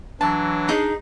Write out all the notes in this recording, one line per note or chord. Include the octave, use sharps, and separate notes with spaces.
E3 F#3 D4 A5
D#4 G#4